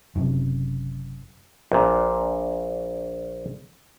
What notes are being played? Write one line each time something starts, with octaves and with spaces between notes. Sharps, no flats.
F#1 F#2 C3
A#1 A#2